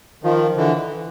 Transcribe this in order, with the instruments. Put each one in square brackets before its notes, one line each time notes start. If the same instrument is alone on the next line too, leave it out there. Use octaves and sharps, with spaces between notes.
[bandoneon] D#3 F3 [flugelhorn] F4
[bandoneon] D3 E3